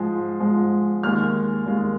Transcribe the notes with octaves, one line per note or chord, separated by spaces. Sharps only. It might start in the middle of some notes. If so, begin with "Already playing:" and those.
Already playing: G#2 F3 G#3
G#2 F3 G#3
D#2 D#3 G#3 F6
D#2 D#3 G#3